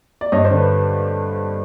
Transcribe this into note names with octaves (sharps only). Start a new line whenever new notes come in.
D5
G2 C#5 D#5
C5 D5
D3
B4 C#5